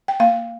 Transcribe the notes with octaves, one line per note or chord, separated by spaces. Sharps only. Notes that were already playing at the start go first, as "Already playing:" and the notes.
G5
A#3 F5